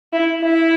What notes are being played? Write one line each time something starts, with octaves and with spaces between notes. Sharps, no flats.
E4
E4